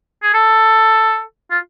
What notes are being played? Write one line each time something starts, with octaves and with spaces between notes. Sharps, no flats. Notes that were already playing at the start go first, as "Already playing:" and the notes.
G#4
A4
F4